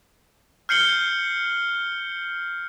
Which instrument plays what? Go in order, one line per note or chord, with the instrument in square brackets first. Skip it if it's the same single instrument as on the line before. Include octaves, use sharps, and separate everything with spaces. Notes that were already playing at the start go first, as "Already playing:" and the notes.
[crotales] F6 G6 C7 C#7 F#7 G7